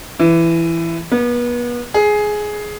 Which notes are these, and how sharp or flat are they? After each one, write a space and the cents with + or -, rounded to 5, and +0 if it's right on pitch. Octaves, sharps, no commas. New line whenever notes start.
E3 +15
B3 -35
G#4 +10